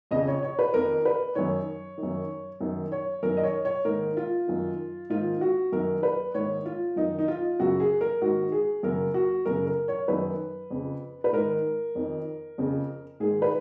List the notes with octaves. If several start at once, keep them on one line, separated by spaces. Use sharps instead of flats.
F2 C#3 D#5
C#5
C#5
B4
F2 D#3 A#4
B4
F#2 D#3 C#5
D#3
F#2
F#2 D#3
C#5
F#2 D#3 A#4
D#5
C#5
C#5
G#2 D#3 A#4
F4
F#2 D#3
G#2 D#3 F4
F#4
F#2 D#3 A#4
B4
G#2 D#3 C#5
F4
F#2 D#3 D#4
D#4
F4
F#2 C#3 F#4
G#4
A#4
G#2 D#3 F#4
G#4
F#2 C#3 A#4
F#4
F#2 C#3 A#4
A#4
C#5
F#2 D#3 B4
F2 C#3
B4
G#2 D#3 A#4
F2 D#3
F2 C#3
G#2 D#3 G#4
B4